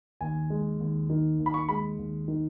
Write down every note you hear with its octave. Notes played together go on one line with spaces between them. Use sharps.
D#2 G#5
G#3
D#2
D#3
D#2
B5
C#6
G#3 B5
D#2
D#3